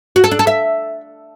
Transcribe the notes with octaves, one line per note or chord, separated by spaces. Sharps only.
F#4
A4
D4
A4
E5